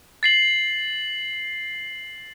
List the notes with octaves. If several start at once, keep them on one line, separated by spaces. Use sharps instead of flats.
A6 C7 F#7